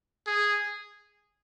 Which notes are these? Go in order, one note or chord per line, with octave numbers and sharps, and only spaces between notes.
G#4